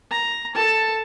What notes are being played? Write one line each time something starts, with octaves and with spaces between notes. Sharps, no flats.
A#5
A4 A5